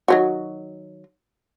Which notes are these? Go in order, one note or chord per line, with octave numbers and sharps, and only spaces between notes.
D#3 F#3 F#4